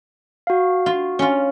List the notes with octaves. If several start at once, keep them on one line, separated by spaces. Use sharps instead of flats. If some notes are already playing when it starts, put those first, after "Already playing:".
F#4 F5
F4
C#4 F4